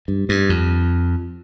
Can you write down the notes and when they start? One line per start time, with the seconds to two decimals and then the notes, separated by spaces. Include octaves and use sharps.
0.08 G2
0.29 G2
0.49 F2